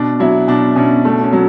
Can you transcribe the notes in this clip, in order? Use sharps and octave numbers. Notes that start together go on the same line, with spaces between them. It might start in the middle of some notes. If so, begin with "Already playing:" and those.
Already playing: B2 D4
F#3 E4
B2 D4
B2 C#4
A3
C#4
F#3